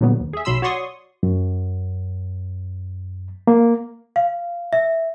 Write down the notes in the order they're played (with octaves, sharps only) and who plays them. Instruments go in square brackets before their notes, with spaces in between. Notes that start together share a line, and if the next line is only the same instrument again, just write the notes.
[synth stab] A#2 D3 F#3 G3 B3
D#2
G#4 E5
B1 F#3 B5 C6 E6
F#4 C#5 D5 C6 C#6 D#6
[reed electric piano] F#2
A#3
[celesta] F5
E5